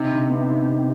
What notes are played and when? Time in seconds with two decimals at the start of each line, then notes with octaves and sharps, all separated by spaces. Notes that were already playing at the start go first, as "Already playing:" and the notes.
Already playing: C3 D#4
0.11 D3
0.29 B3
0.48 D#4
0.66 D#4